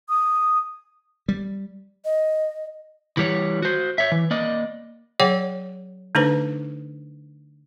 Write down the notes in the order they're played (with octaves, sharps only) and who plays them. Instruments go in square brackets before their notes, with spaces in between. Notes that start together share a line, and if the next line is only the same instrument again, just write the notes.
[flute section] D#6
[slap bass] G3
[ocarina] D#5
[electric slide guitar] E3 G3 C#5
F#4 C5
C#5 E5
E3
A#3 D5 D#5
[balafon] F#3 G#4 C#5 D5 F#5 G5
D3 A3 D4 D#4 B4 C5